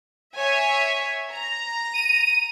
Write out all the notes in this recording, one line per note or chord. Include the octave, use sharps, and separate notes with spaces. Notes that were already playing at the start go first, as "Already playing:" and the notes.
C#5 E5 G#5
A#5
D#7